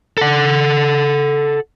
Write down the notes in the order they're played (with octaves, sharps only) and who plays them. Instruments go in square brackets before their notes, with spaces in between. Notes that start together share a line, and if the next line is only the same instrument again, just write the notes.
[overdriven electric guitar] A4 F#5